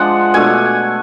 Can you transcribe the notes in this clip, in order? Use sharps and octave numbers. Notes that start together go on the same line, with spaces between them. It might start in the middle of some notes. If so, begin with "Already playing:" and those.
Already playing: F3 G#3 D4 D5 F#5
B2 A3 D4 G#5